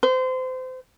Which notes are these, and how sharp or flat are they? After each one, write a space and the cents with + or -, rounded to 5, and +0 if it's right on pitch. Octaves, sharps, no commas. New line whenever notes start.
C5 -30